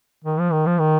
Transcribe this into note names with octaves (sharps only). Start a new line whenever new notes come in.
D#3
F3
D#3
F3
D#3